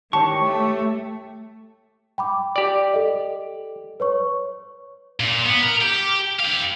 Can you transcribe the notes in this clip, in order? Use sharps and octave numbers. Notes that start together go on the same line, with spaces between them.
D#3 G4 C#5 A5 C#6
A3
G5 B5 D6
G4 D5
A4 D#5
B4 C#5 C#6
A#2
B3
A#4
G4
G4 F5